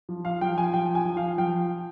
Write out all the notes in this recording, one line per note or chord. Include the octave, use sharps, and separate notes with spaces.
F3
F5
F3 G5
G#5
F3 G5
G#5
F3
F5
F3 G5